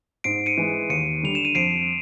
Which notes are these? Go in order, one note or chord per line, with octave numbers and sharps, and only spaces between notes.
G#2 C7 D7
C#7 D#7
E3 G#3
D#2 C#7 D#7
D3 G3 F7
E7
D#7
F2 C7 D7